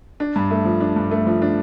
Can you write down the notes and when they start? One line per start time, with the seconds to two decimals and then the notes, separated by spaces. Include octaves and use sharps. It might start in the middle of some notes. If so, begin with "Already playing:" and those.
0.20 D4
0.36 G2
0.51 A3
0.65 F3
0.81 D4
0.96 G2
1.11 A3
1.27 F3
1.42 D4